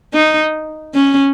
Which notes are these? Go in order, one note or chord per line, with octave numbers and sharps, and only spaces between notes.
D#4
C#4